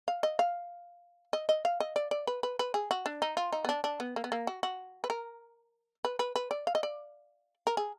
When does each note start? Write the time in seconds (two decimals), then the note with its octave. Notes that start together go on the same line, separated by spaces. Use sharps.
0.08 F5
0.23 D#5
0.39 F5
1.33 D#5
1.49 D#5
1.65 F5
1.80 D#5
1.96 D5
2.11 D5
2.27 B4
2.43 B4
2.59 B4
2.74 G#4
2.91 F#4
3.06 D4
3.22 D#4
3.37 F4
3.53 D#4
3.65 B3
3.69 D4
3.84 D4
4.00 B3
4.16 A#3
4.24 B3
4.32 A#3
4.47 F#4
4.63 F#4
5.04 B4
5.10 A#4
6.05 B4
6.19 B4
6.36 B4
6.51 D5
6.67 F5
6.75 D#5
6.83 D5
7.67 A#4
7.77 G#4